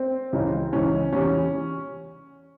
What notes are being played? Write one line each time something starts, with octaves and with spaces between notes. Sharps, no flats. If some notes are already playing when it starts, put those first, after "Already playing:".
Already playing: C4
C#2 C#3 E3
C#2 C#3 E3 C#4
E2 C3 E3 C#4